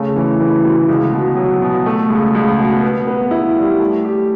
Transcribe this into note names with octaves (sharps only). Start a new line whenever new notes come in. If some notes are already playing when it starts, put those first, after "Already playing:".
Already playing: C#3 A3
E3
E3
D2
C#2
B2
F#3
B2
A3
C#2
C#2
B2
B3
B3
E4
G3
A3
G4